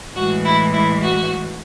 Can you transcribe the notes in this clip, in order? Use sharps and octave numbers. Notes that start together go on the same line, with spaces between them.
A2 E3 G#3 F#4
E4
E4
F#4